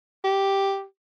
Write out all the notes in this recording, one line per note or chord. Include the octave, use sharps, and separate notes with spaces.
G4